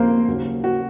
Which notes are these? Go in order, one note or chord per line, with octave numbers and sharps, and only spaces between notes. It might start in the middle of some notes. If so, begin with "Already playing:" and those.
Already playing: D#2 C#3 F3 A#3 C4 A#4 C5
D#2 C#3 F#3
F#4